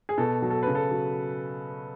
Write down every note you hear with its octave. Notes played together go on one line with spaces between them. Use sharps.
G#4
B2 A4
F#3
A4
C#3 B4
A4
F#3